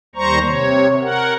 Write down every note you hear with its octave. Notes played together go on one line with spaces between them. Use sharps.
D#2 G3 C5 A#5 C#6
C3 C#5
A#4 F#5